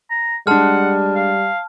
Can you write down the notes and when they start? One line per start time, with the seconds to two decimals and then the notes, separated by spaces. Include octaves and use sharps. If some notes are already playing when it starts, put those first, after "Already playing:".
0.11 A#5
0.47 G3 G#3 D4 F#5 A5 F6
1.16 F5